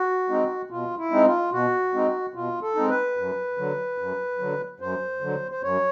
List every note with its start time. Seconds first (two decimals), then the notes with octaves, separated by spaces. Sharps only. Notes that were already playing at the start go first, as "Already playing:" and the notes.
Already playing: F#4
0.29 G#3 C4 D#4
0.70 B2 F4
0.98 E4
1.11 G#3 C4 D#4
1.26 F4
1.52 B2 F#4
1.94 G#3 C4 D#4
2.34 B2 F4
2.62 A4
2.75 G#3 C4 D#4
2.89 B4
3.17 F#2
3.58 D3 F#3
3.98 F#2
4.39 D3 F#3
4.80 F#2 C5
5.21 D3 F#3
5.52 C5
5.63 F#2 C#5